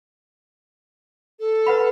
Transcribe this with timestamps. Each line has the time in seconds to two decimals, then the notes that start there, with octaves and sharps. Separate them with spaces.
1.40 A4
1.67 B4 F#5 B5